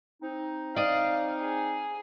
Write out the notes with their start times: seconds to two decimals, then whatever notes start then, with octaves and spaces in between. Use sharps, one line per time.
0.22 C4 D#4
0.76 D5 D#5 F5
1.41 G#4